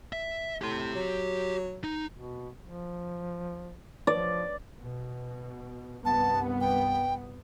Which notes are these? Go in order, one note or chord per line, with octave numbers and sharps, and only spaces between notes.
E5
A2 G4 C6
F#3
D#4
B2
F3
F3 D5
B2
C2 G2 B3 A5
G5